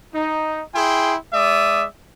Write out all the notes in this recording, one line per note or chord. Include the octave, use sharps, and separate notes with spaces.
D#4
E4 G#4 G5 C6
G#3 D5 E5 D#6